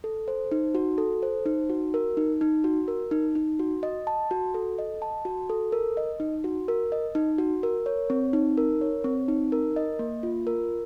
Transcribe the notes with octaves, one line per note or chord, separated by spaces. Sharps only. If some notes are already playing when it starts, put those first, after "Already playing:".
A4
C5
D#4
F#4
A4
C5
D#4
F#4
A#4
D#4
D#4
F#4
A#4
D#4
D#4
F#4
D#5
A5
F#4
A4
D#5
A5
F#4
A4
A#4
D#5
D#4
F#4
A#4
D#5
D#4
F#4
A#4
C#5
C4
D#4
A#4
C#5
C4
D#4
A#4
D#5
A#3
F4
A#4